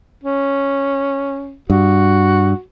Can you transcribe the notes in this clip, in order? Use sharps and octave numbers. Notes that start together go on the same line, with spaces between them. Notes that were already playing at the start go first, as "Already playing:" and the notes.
C#4
G2 F#4